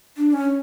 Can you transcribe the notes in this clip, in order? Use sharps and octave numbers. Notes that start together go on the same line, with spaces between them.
D4
C#4